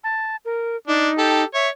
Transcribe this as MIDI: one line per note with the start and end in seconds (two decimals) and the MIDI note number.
0.04 0.36 81
0.45 0.76 70
0.88 1.09 62
0.88 1.44 63
1.18 1.43 67
1.18 1.43 69
1.54 1.68 73
1.54 1.69 76